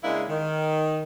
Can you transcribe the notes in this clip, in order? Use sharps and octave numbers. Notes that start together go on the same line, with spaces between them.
C#3 G#3 A#3 D4 E4
D#3